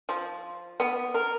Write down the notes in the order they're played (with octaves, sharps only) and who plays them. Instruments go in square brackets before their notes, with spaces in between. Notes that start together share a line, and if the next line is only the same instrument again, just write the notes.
[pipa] F3
B3
A#4